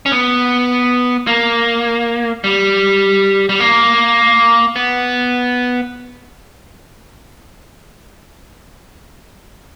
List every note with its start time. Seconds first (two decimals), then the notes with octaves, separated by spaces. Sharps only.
0.06 C#4
0.12 B3
1.27 A#3
2.44 G3
3.49 G3
3.60 A#3
4.76 B3